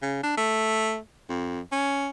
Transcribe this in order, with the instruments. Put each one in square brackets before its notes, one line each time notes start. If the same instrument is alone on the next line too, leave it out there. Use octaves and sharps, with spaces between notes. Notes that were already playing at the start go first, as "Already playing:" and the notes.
[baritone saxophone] C#3
D4
A3
F2
C#4